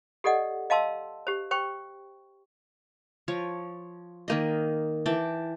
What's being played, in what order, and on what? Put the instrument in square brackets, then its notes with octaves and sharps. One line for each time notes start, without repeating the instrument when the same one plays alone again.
[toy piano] G4 A4 D5 D#5 F#5
D#5 F5 A5 C6 E6
G4 C5
C5 G5 C#6
[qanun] F3 C#5
D#3 A#3 D#5
E3 G5 A5 D6